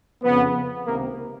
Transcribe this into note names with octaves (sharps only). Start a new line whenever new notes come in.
F2 C#3 F3 B3
C#2 C3 D#3 A#3